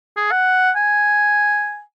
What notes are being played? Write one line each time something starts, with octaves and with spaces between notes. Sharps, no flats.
G#4
F#5
G#5